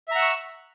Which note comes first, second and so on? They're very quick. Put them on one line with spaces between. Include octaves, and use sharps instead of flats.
E5 A#5 F#5 E6 C#6